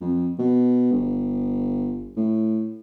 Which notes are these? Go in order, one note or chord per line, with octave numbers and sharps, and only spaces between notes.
F2
B2
G1
A2